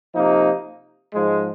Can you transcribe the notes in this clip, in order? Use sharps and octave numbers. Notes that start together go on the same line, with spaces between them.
C3 F3 A#3 D#4
G#2 F3 G#3